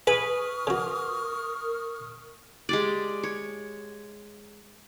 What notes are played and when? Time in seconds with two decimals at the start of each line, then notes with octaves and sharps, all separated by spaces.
0.07 E4 G#4 B4 C#6 D#6 F6
0.67 C#3 F#4 A#4
2.69 G#3 G4 D5
3.23 C#5